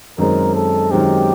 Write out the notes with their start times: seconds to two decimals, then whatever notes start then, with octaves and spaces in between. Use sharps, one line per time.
0.18 F#2 D#3 G#3 C4 A#4
0.55 A4
0.91 F#2 D#3 G#3 C4 G4